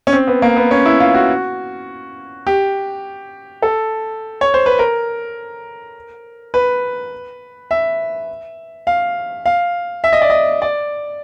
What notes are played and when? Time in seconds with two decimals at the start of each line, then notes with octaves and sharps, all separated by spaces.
0.07 C#4
0.13 C4
0.27 B3
0.42 A#3
0.56 B3
0.71 C#4
0.86 E4
1.00 F4
1.15 F#4
2.47 G4
3.62 A4
4.41 C#5
4.54 C5
4.66 B4
4.79 A#4
6.54 B4
7.71 E5
8.87 F5
9.46 F5
10.04 E5
10.13 D#5
10.21 D5
10.30 D#5
10.62 D5